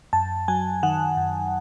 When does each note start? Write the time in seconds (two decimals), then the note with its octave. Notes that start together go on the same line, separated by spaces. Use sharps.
0.13 F#2 A5
0.48 F#3 G#5
0.83 D#3 F#5
1.17 F#2